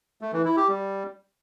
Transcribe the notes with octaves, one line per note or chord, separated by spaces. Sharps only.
A3
E3
E4
G4
G3